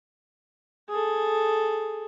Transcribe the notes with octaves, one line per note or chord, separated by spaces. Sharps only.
G#4 A4